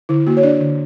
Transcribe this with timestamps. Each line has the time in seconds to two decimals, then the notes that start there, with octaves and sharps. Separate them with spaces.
0.09 D3 E4
0.27 A#3 F#4
0.37 C#5
0.43 D4 D5
0.60 D3